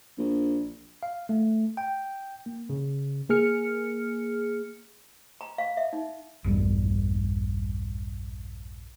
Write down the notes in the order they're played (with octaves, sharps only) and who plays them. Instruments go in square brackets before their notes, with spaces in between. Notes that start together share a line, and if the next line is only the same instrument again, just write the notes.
[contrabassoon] A#1
[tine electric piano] F5
A3
G5
A#3
C#3
[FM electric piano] A#3 G#4 F6 C#7
[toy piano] A#5
F5
E5
D#4
[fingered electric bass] A#1 E2 G2 G3